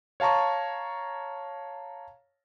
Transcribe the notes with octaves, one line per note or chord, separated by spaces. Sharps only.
C#5 F5 A5 A#5 C#6